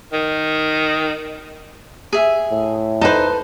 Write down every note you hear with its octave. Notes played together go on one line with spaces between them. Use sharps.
D#3
G#4 E5
A2
D#4 B4 C5 A5